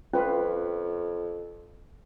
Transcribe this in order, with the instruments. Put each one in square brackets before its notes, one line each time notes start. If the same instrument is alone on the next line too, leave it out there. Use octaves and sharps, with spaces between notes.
[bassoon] F2 [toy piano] C#4 [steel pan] F4 B4 F5